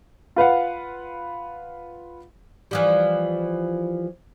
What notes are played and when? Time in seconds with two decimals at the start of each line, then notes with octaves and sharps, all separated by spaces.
0.36 F4 B4 F5 F#5
2.71 E3 F3 G3